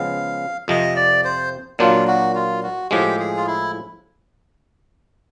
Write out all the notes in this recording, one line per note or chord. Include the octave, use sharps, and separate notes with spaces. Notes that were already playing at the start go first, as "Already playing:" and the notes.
Already playing: C#3 F3 G#3 B3 F5
F2 C3 F3 D#5
D5
C5
A#2 F#3 A#3 D4 F4
F#4
F4
F#4
A2 F3 G#3 G4
G#4
F4
E4